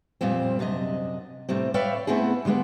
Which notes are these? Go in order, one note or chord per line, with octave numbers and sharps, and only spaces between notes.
F2 A#2 G3 A#3 C4
F#2 C3 D4 D#5
A2 C3 G3 C4
B4 C#5 D5 E5 F5 G5
A3 B3 C4 E4 G#4
D3 G3 G#3 A#3 B3